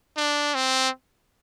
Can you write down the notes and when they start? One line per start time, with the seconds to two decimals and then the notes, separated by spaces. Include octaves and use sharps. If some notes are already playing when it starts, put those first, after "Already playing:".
0.17 D4
0.55 C4